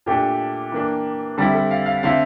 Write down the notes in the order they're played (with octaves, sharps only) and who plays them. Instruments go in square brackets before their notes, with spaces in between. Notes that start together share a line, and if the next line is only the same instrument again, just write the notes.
[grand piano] A#2 A3 D4 G4
E3 A#3 D4
D3 G3 C4 E4 A4
A4
F5
F5
D3 A3 C4 E4 F5